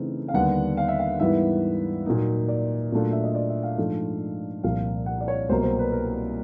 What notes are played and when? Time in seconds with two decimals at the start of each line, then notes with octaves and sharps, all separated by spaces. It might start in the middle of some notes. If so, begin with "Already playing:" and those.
Already playing: C#3 E3 A3 C4 D#4
0.28 F5
0.34 D#2 D3 G3 B3 D4 F#5
0.77 F5
0.88 E5
0.99 F5
1.20 G#2 E3 G3 B3 E4 E5
2.06 A#2 F#3 A#3 D#4
2.48 D5
2.92 A#2 F#3 A3 D4 F4
3.12 E5
3.24 D#5
3.35 D5
3.49 E5
3.63 F5
3.78 G#2 F3 A3 D4 F4
4.64 C2 A#2 F3 F5
5.06 F#5
5.21 D5
5.28 C#5
5.49 C2 B2 F#3 A#3 C5
5.63 C5
5.79 B4
5.92 A#4